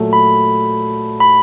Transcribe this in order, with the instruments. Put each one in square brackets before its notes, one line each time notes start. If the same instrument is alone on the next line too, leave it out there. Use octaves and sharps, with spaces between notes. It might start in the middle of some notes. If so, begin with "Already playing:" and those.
Already playing: [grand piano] A#2 F#3 A3
[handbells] B5
B5